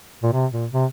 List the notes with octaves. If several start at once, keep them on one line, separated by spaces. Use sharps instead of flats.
A#2
C3
A#2
C3